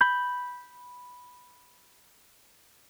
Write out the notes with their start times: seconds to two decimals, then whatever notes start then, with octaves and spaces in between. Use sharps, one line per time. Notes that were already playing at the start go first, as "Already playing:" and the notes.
0.01 B5 G6